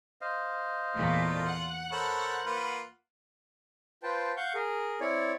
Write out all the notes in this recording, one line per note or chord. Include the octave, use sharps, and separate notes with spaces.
C5 D#5 F5
E2 A#2 A3 F4
F#5
A4 A#4 C5 C#5 B5
A#3 F4 B4
F4 B4 C5 G5 A5
F5 F#5 C#6 G6
G#4 A#4
C4 E4 C#5 D5